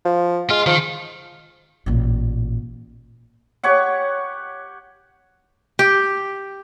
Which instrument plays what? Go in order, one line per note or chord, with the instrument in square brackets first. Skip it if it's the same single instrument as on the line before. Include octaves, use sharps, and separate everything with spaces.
[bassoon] F3
[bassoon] G#3 [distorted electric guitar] F4
[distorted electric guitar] D#3 [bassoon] F3
[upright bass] A1 A#2
[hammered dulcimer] G4 C#5 F#5
[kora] G4